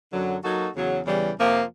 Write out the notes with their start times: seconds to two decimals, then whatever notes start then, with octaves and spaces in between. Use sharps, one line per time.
0.12 F#2 D3 F#3
0.43 F#3 A#3 D#4 F#4 A4
0.74 E2 C#3 F#3
1.05 E2 C#3 E3 G3
1.37 F2 C3 F3 A#3